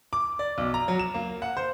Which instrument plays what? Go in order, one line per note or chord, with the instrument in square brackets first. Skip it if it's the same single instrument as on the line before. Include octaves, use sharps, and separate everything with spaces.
[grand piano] D6
D5
B1
A#5
F#3
E7
A#3
F#5
C5